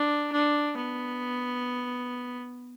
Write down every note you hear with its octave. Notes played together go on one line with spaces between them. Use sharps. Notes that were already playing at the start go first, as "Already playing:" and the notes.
Already playing: D4
D4
B3